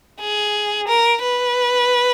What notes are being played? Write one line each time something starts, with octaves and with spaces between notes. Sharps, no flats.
G#4
A#4
B4